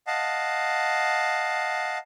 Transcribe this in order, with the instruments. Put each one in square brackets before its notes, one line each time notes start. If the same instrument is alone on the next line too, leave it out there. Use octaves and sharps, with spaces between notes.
[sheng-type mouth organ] D#5 F5 F#5 A5